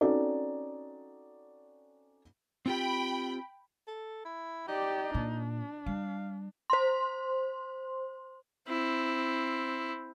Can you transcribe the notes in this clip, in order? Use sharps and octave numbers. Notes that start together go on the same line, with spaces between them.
C4 C#4 D#4 F#4 A4 D5
C4 F4 G4 G5 B5
A4
E4
D#4 G4 D5
A#2 D4
G3 F5
C5 C6
C4 E4